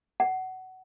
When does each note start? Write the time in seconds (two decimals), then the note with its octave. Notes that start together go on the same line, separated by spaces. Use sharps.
0.20 F#5